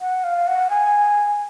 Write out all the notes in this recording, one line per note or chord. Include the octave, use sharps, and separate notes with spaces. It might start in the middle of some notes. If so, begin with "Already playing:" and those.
F#5
F5
F#5
G#5